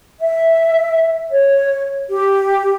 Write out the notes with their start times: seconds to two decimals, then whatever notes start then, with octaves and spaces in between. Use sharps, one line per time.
0.20 E5
1.32 C#5
2.09 G4